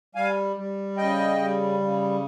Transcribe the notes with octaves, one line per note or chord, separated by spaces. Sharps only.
G3 F5 G#5
G3
C#3 D#5 G5
G3
C#3